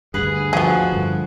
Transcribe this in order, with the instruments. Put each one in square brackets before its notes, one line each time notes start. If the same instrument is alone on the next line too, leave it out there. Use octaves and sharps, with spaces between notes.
[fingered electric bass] D2 G2 [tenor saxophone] G#4 [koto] B4 F#5
[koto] F3 [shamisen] B3 G#4 [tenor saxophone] F#4
[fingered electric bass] G2 D3